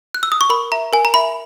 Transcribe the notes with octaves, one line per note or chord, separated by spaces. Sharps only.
F#6
E6
D#6
C#6
A#4 B5
E5 A#5
A#4 G#5
A#5
E5 B5